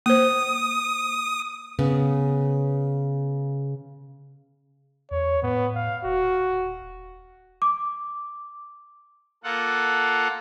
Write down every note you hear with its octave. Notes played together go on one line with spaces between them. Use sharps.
A#3 C5 D#6
C#3 B3
E2 C#5
A2 B3
F5
D#1 F#4
D6
A#3 F4 A4 F#5